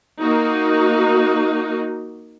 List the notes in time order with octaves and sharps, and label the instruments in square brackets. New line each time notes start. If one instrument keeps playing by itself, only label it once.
[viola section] A#3 D#4 F#4